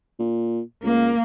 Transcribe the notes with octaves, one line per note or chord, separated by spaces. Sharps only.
A#2
C#2 A#3